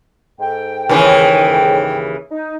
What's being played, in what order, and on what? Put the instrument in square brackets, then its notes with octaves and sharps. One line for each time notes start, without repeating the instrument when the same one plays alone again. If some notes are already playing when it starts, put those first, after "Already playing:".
[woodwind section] G#2 A4 G5
[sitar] D#2 C#3 E3
[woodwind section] D#4